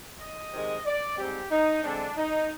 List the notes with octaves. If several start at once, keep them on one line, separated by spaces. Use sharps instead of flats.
D#5
C3 D#3 G#3
D5
G#2 G3 C4 G4
D#4
D3 G#3 C4 D4
D#4